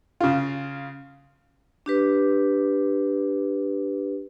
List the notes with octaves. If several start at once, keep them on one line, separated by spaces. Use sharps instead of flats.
C#3 F4
D4 G4 B4